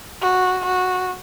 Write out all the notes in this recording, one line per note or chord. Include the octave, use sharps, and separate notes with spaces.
F#4
F#4